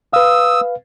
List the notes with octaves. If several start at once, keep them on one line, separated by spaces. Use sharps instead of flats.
B4 F5 D#6 E6